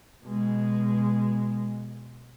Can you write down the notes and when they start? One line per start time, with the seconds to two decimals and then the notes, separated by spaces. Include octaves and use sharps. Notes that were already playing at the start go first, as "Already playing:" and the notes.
0.23 B2 G#3